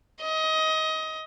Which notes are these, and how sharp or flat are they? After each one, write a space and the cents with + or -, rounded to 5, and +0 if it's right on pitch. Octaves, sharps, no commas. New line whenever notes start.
D#5 +25